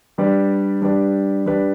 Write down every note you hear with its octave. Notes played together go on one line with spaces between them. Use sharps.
G3 D4 G4 B4 D5
G3 D4 G4 B4 D5
G3 D4 G4 B4 D5